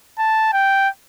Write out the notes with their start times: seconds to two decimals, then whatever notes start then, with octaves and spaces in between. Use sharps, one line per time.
0.19 A5
0.53 G5